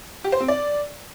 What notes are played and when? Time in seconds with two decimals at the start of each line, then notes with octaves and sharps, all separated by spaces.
0.24 G4
0.32 C5
0.40 C4
0.48 D5